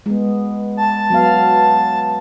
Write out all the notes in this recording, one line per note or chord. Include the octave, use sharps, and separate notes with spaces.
G#3 B3
A5
F#3 B3 F5